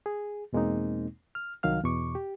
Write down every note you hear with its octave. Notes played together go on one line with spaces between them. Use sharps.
G#4
E2 B2 G#3 A#3 C4 D#4
F6
C2 D#3 F#3 F5 F6
E2 B2 C#6 D6
G4